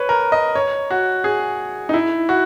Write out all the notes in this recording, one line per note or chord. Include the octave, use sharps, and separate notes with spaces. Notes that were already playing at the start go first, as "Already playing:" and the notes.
Already playing: B4 C#5
A#4
D#5
C#5
F#4
G#4
D#4
E4
F#4